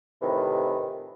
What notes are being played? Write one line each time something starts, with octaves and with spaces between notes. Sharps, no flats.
F2 A2 C3 D#3 E3